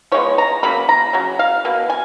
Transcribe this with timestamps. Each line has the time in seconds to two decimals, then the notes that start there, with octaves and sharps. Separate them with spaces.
0.12 F3 G#3 B3 C#5
0.38 A#5
0.63 C#3 F#3 A#3 B5
0.89 A#5
1.13 C#3 F#3
1.39 F5
1.65 B2 A#3
1.90 G#5